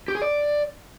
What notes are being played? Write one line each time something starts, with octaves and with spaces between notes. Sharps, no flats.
G4
G#4
D5